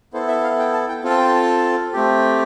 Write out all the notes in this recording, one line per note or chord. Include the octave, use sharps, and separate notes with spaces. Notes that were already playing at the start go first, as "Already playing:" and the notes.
B3 E4 A4 C5
E5
F5
G5
A5
G5
C4 F4 A4
A5
G5
A5
A3 C4 G4